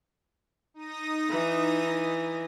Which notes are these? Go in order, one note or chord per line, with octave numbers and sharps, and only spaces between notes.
D#4 D#6 A#6
E3